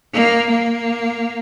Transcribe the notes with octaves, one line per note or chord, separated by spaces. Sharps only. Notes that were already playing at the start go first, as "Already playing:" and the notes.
A#3
A#3